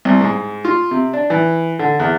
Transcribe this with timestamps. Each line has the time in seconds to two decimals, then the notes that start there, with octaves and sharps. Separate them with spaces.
0.05 C2
0.21 G#2
0.65 F4
0.91 C3
1.13 D4
1.30 E3
1.79 D3
2.00 E2